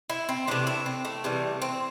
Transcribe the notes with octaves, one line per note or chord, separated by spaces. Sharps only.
E4
C4
C3 E3 A3 D4
E4
C4
A3
C3 E3 G3
C4